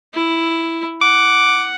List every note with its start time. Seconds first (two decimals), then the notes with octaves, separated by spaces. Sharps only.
0.14 E4
1.02 F#5 D6